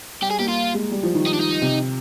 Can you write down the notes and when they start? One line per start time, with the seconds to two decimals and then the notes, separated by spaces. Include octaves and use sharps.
0.22 G3 G4
0.31 G#4
0.40 A#3 G4
0.49 F4
0.74 G#3
0.91 G3
1.03 F3
1.15 D#3
1.26 D#4
1.33 D4
1.40 D#4
1.62 C3